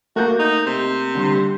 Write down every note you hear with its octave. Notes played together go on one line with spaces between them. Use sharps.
A3 A#3 F#4 A#4 G6
D#4
C3
D3 G3 C6